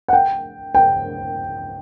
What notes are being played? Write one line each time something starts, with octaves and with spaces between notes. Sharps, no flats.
F#5
G5
G5